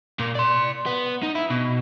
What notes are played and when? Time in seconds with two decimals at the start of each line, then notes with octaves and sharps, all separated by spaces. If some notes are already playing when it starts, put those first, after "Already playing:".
0.19 A#2 A#3
0.35 D5 C6
0.86 B3
1.23 D#4
1.35 E4
1.50 B2